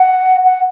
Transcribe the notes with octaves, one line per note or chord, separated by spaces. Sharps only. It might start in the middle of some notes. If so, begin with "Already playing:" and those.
Already playing: F#5
F#5